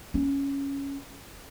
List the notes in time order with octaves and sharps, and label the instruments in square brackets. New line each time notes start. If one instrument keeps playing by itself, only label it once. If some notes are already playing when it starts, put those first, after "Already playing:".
[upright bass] C#4